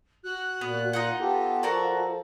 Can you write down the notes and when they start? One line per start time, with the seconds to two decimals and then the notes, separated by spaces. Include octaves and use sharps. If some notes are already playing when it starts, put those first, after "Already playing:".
0.23 F#4 F#6
0.61 A#2 B3
0.93 D#4 F4 D#5 F#5
1.20 B3 F4 G4 A4
1.63 F3 F#4 A#4 D5